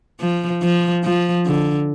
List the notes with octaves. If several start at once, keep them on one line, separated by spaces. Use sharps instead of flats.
F3
F3
F3
D3